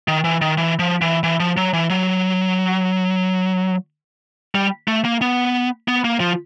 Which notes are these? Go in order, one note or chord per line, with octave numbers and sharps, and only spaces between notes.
D#3
E3
D#3
E3
F3
E3
E3
F3
F#3
E3
F#3
G3
A3
A#3
B3
B3
A#3
F3